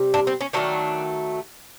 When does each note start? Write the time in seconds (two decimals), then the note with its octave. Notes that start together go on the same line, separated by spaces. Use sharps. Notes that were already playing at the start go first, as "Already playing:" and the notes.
Already playing: C3 G3
0.14 D4
0.27 C4
0.41 C#4
0.53 D#3 F#3 A3 D4